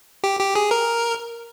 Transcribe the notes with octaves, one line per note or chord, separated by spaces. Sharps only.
G4
G4
G#4
A#4